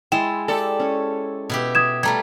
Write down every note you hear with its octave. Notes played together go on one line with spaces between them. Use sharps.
G#3 E4 G5 A5 C6 E7
G4 A4 D5
C#4 C#5
B2 E4 G4
D#6 G#6 E7
G3 A3 F4 A#5 G#6